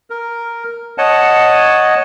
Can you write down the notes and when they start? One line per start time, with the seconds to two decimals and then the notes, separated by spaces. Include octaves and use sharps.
0.10 A#4
0.98 C#5 D#5 F#5 A5